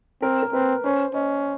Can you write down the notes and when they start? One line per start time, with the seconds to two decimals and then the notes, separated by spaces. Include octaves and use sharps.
0.22 C4 A#4
0.43 A#4
0.53 C4 B4
0.84 C#4 C5
1.14 C#4 D#5